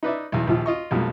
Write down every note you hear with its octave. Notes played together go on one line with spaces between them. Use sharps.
D#4 B4 D5 E5
B1 E2
A#1 D#2 F3 F4
F4 D#5 C#6
B1 F2 B2 F3 G#3 A#3